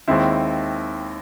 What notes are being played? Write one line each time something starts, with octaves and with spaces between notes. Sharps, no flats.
D#2 D#3 G#3 C4 E4